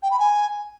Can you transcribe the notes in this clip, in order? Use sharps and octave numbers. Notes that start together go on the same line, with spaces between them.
G5
B5
G#5